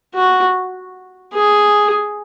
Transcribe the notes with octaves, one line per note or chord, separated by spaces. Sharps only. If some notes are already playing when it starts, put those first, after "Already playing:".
F#4
G#4